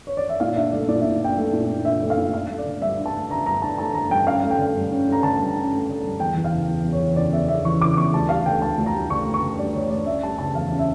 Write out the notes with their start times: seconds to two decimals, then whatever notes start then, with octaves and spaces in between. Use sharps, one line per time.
0.07 C#5
0.17 D5
0.29 E5
0.40 A#2 F5
0.56 D4 E5
0.72 A3 D5
0.88 A#2 D5
1.01 A#2 E5
1.22 D4 G5
1.37 A3
1.53 A#2
1.69 A#2
1.85 D4 E5
2.02 A3
2.10 F5
2.17 A#2
2.34 D4 F5
2.50 A3
2.59 D5
2.66 D3
2.82 G2 E5
2.99 D4
3.06 A5
3.15 A3
3.30 D3 A#5
3.46 G2 A#5
3.62 D4 A5
3.78 A3 A5
3.94 D3 A#5
4.10 G2 G5
4.27 C#4 F5
4.44 A3
4.51 G5
4.59 D3
4.76 G2
4.91 C#4
5.08 A3 A#5
5.23 D3 A5
5.40 G2
5.56 C#4
5.72 A3
5.89 D3
6.04 G2
6.20 E2 G5
6.36 E3
6.44 F5
6.52 C#3
6.68 E2
6.85 E2
6.93 C#5
7.01 E3
7.16 C#3 D5
7.33 E2 E5
7.48 E2 E5
7.65 E3 C#6
7.81 C#3 D6
7.97 E2 C#6
8.14 D2 A5
8.29 G3 F5
8.46 D3 G5
8.61 D2 A5
8.78 D2
8.86 A#5
8.94 G3
9.10 D3 C#6
9.26 D2
9.34 C#6
9.43 D2
9.58 G3 D5
9.74 D3 C#5
9.90 D2 D5
10.06 C#4 E5
10.22 G3 A5
10.39 C#3 A5
10.55 E2 F5
10.72 C#4
10.79 E5